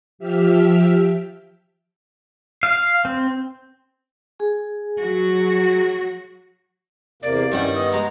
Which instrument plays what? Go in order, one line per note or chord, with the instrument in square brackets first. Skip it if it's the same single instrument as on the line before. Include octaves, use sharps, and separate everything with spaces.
[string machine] F3 G4 E5 F6
[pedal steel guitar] F5
C4
[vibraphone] G#4 G#5
[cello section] F#3 F#4
[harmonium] E2 C3 A#3 [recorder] D5
[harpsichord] G2 D#3 F#5 [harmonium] C#4 E4
[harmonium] B3 [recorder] D#5
[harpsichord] G#3 [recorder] A#5